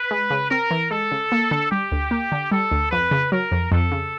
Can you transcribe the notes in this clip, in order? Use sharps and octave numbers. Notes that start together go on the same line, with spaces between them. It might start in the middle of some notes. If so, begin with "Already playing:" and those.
Already playing: B4
G#3
C#3
C4 A#4
E3
G#3 A4
C#3
A#3
D3
G3 G4
D2
A#3
D3
G3 A4
D2
F2 B4
C#3
F#3 A#4
F2
F2 A4
C#3